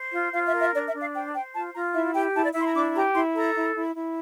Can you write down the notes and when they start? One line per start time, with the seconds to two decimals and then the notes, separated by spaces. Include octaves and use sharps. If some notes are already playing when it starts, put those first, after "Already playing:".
Already playing: C5
0.13 F4
0.33 F4 F5
0.46 E5
0.53 A#4
0.60 E5
0.74 D4 D5
0.87 E5
0.93 D4
1.00 F5
1.14 C5 G5
1.34 C5 G5
1.54 F4 A5
1.74 F4 A#5
1.94 E4 E5
2.14 G4 G5
2.34 E4 A5
2.44 D5
2.54 E4 E5
2.60 C6
2.64 A#5
2.74 D4 D6
2.94 G4 A#5
3.14 E4 C6
3.34 A4 A#5
3.55 E4
3.75 E4
3.95 E4